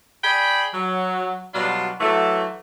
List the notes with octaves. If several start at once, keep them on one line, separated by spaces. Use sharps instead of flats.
G#4 D5 G5 B5
F#3
B2 F#3 G3 D4 F4
E3 F#3 A3